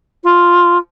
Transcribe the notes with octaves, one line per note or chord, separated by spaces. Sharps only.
F4